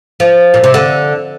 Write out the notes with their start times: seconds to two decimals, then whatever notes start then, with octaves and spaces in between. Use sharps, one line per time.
0.20 F3
0.54 A#2
0.64 C3
0.74 D3